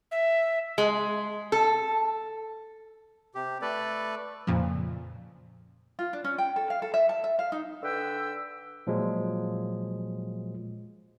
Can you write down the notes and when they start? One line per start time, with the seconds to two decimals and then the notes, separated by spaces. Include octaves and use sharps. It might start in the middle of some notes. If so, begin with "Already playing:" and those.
0.11 E5
0.78 G#3
1.52 A4
3.35 C3 G4
3.62 A3 A4 B4 D5
4.47 F2 A#2 C#3 F3
5.99 F4
6.13 D4
6.24 C#4
6.38 G5
6.56 A4
6.70 F5
6.82 A4
6.94 E5
7.09 A5
7.24 E5
7.39 F5
7.52 D#4
7.83 D3 B4 G5 E6
8.87 A#2 F3 F#3 G#3